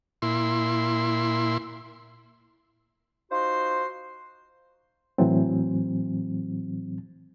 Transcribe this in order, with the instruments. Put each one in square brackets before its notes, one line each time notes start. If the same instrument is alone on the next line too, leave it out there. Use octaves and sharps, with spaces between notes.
[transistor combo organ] A#2 E4 C6
[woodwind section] D#4 F4 F#4 C5 C6
[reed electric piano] A2 E3 F#3 C4